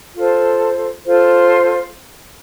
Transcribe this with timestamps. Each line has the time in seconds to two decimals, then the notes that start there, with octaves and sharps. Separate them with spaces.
0.15 F4 A4 C5
1.05 F4 A4 C5